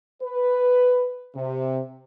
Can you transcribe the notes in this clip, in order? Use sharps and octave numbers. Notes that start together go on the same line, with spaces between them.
B4
C3